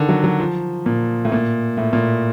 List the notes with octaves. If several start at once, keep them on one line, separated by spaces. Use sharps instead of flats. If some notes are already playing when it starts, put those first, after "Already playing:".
Already playing: D3 D#3
F#3
F#3
F3
A#2
A2
A#2
A2
A#2